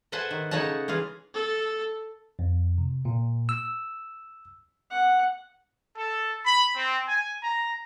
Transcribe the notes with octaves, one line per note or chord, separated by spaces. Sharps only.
A4 B4 C5 E5 F#5 G#5
D#3
C#3 A3 D#4 C#5 F#5 A5
E3 F4 G#4 F5
A4
F2
C3
A#2
E6
F#5
A4
B5
C4
G#5
A#5